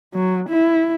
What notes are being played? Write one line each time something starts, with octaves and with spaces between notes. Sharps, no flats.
F#3
E4